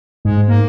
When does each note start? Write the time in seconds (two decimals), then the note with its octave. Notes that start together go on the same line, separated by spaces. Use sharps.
0.25 G#2 G#3
0.48 A#3